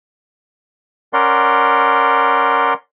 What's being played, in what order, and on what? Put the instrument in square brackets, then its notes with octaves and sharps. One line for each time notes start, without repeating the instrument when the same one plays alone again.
[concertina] C#4 A#4 D5 F#5 C6